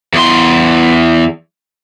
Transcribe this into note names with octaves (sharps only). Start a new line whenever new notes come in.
E2 C6